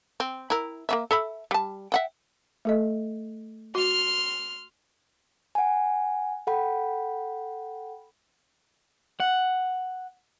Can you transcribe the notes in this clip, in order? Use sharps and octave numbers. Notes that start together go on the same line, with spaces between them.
C4
E4 A#4
A#3 C#4 E5
A4 E5 B5
G3 A5
E5 F#5 G5
A3 A4 D#5
F#4 C6 F6
F#5 G#5
A4 F#5 G5 B5
F#5